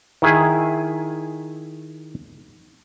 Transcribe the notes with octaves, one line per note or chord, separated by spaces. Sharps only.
D#3 E4 G#4 G#5